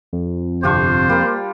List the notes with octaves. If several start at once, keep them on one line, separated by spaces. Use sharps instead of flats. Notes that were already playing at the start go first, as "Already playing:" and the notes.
F2
G1 C3 D4 F4 G4 C5 C#6
G3 A#3 A#4